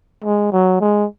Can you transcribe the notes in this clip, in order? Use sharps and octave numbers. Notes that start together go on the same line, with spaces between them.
G#3
F#3
G#3